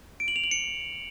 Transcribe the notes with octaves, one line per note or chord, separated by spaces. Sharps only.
D7
F#7
F7
F#7
C#7